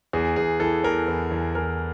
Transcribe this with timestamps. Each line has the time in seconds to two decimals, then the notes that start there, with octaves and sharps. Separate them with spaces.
0.13 E2 G#4
0.36 E2 G#4
0.60 E3 A4
0.84 E2 A#4
1.08 E2
1.31 E2
1.55 E3 A#4